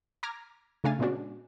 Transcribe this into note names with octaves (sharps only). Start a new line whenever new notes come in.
A#5 D6 F6 G#6 A#6
C#3 A3 D4 F5 G#5 A6
A#2 G#3 B3 C#4 D4 F#4